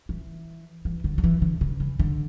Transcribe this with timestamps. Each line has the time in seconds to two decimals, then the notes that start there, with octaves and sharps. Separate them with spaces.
0.09 E3
0.85 E3
1.04 D3
1.18 F#3
1.24 E3
1.42 D3
1.61 C#3
1.80 E3
1.99 D3